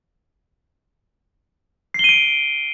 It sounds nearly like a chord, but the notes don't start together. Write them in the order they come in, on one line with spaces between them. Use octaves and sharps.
C7 G7 D#7 D7